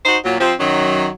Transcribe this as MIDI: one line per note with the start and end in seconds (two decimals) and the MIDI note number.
0.06 0.17 63
0.06 0.17 66
0.06 0.17 72
0.25 0.36 46
0.25 0.36 54
0.41 0.53 53
0.41 0.53 60
0.58 1.07 42
0.58 1.07 51
0.58 1.07 54